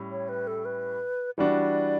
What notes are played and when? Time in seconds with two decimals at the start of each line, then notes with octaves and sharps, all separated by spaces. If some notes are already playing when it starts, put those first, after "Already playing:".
Already playing: A2 G3 C#4
0.11 C#5
0.29 B4
0.47 A4
0.65 B4
1.38 E3 G3 D4 F#4 D5